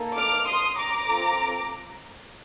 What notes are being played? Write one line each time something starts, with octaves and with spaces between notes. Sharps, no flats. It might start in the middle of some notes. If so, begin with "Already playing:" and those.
Already playing: A#3 D#4 A4
D6 F6
C6 D#6
A#5 D6
C4 F4 A4